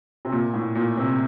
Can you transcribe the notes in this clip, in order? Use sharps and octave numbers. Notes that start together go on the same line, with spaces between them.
C3
A#2
A2
A#2
C3